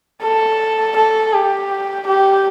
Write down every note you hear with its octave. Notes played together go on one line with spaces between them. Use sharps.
A4
A4
G4
G4